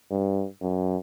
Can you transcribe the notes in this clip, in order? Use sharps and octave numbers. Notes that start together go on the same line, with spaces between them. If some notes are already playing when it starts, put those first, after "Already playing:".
G2
F#2